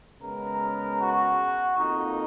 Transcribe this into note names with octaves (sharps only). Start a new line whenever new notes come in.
C#3 G#3 B3 A#4
F#4
F2 D#3 A#3 D#4